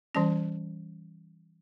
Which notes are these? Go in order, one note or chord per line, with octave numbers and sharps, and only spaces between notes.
E3 G3 C#4 A5